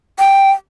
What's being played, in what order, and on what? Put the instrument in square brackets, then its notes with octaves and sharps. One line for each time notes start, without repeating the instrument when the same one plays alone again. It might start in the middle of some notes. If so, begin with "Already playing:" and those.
[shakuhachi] G5